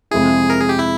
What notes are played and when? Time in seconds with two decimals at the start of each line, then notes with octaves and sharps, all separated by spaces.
0.11 F2 C3 F3 G#3 E4 G#4
0.50 A#4
0.60 G#4
0.69 G4
0.79 E4